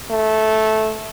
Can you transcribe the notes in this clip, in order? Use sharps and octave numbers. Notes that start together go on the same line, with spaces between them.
A3